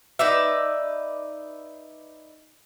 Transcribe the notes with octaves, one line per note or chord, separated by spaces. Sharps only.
D#4 B4 D5 E5